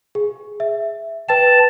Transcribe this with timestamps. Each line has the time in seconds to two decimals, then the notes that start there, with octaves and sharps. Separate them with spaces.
0.15 G#4
0.60 E5
1.29 B4 G5 A5